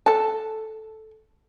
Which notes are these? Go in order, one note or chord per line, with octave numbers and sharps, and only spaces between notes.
A4 A5